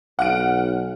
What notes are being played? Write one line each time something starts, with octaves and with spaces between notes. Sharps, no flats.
B1 F#5 F6 D7